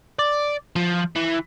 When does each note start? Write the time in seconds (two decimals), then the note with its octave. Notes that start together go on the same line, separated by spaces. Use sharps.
0.19 D5
0.76 F3
1.16 E3